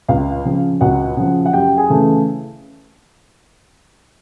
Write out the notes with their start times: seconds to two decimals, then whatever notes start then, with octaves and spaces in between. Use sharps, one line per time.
0.08 C#2 F5
0.45 C#3 F3
0.81 C#2 F#4 F#5
1.16 C#3 F3
1.46 F#5
1.53 F#2 G4 G5
1.78 G#4 G#5
1.89 C#3 E3 A3